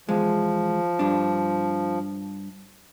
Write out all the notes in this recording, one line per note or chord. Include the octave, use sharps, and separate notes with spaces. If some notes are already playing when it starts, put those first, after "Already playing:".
E2 F3 G#3
G2 D4